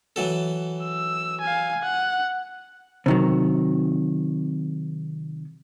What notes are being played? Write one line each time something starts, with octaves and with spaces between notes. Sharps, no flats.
E3 F#3 A4
E6
F5 G#5
F#5
C3 D#3 F#3